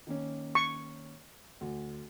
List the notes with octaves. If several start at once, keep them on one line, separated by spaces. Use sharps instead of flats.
D#3 A#3 C#4
C#6
D2